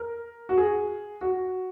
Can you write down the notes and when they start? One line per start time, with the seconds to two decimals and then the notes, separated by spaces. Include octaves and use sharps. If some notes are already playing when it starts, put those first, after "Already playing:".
Already playing: A#4
0.49 F#4
0.58 G#4
1.21 F#4